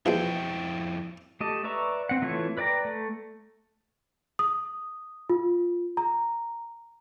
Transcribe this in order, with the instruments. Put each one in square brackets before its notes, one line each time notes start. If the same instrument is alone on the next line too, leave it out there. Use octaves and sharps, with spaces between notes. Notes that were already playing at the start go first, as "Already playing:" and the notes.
[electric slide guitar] F2 E4 G5 [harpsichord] E3 F3 G#3
[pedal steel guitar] A3 G4 D#5 A5
B4 D5 E5 A#5 C#6
C4 F#5
E3 A3 F4 C#5
B4 D5 G5 A#5
A3
[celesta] D#6
F4
A#5